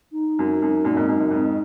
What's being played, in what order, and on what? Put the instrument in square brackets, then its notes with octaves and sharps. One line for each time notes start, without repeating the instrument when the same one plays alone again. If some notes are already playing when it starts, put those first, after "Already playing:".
[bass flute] D#4
[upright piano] F#2
F#2
F#2 A#2
F2 G#2
F#2
F#2
F2 G#2